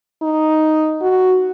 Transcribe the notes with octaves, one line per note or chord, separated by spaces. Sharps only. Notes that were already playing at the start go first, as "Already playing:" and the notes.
D#4
F#4